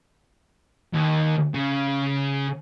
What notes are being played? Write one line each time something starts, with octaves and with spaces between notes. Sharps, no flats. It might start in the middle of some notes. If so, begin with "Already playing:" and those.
D#2
C#3